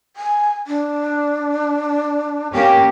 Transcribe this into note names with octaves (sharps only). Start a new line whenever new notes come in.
G#5
D4
A#3 C#4 G4 A#4